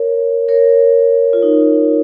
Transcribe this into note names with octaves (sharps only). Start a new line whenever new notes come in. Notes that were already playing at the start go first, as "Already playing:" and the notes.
Already playing: A#4 C#5
A#4 C#5
F4
D#4